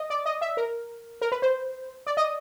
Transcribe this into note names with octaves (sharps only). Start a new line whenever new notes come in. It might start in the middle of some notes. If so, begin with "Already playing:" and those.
Already playing: D#5
D5
D#5
E5
A#4
A#4
B4
C5
D5
D#5